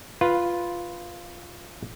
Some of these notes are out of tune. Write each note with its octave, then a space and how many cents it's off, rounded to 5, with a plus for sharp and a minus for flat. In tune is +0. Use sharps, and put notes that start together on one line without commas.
F4 +0 B4 +0